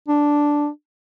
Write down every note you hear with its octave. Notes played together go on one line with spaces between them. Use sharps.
D4